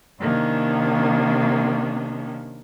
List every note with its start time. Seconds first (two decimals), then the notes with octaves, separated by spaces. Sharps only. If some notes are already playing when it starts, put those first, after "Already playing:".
0.20 C3 D#3 A#3 C#4 D4